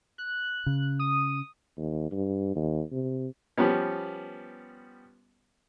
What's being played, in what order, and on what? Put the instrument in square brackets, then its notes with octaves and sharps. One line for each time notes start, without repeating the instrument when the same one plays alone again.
[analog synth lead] F#6
[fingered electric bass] C#3
[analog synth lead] D#6
[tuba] D#2
G2
D#2
C3
[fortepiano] F3 G3 B3 C#4